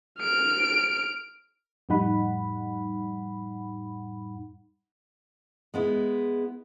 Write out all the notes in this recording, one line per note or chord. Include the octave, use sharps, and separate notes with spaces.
F6 D7
F2 A2 G3 D#4 F#5 B5
G#3 B3 E4